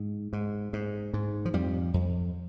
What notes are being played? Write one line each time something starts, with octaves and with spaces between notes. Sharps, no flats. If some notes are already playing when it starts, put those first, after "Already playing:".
Already playing: G#2
G#2
G#2
G#2
F3
F2 G3
F2